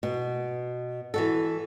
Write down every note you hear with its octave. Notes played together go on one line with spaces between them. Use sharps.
B2
E3 F#4 A4